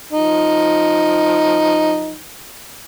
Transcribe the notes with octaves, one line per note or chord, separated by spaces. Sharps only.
F3 D#4